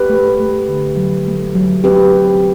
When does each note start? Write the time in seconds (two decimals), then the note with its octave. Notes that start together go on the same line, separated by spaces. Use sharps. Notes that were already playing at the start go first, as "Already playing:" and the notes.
Already playing: G4 B4
0.10 A3
0.40 A3
0.69 D3
0.97 F#3
1.27 A3
1.55 F#3
1.84 C4 G4 B4